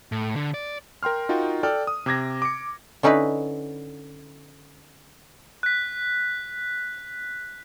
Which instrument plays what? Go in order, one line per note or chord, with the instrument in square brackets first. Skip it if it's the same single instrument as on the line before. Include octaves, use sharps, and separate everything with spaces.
[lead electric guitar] A2
D3
D5
[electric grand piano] A#4 G5 C6 F6
D#4 F4 F#4 A#4 G5
A4 D5 G5 F6
D#6
C3 D6 G#6 A#6
D6 C#7
[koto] D3 C#4 D#4 E4 B4
[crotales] F#6 B6